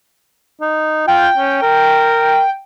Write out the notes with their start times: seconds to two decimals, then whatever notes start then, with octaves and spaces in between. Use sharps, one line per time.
0.61 D#4
1.07 F4 G5
1.38 C#4
1.62 A#4